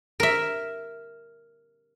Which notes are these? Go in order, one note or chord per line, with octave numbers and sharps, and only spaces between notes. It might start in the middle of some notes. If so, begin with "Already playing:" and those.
A#4 E5